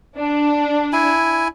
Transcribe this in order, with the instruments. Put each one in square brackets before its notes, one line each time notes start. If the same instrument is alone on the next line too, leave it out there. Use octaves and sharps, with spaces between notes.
[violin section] D4
[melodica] E4 G#5